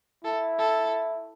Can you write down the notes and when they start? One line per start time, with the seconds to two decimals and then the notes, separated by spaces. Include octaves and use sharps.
0.24 E4 A4
0.59 A4